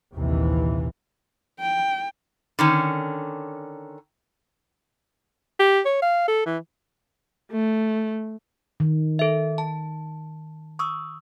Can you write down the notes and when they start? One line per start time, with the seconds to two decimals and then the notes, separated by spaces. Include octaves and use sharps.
0.14 A#1 D#2 C3 E3
1.60 G5
2.59 D3 D#3 C#4
5.59 G4
5.85 C#5
6.02 F5
6.28 A4
6.46 E3
7.52 A3
8.80 D#3
9.19 A4 E5
9.58 A5
10.79 C#6 D#6 E6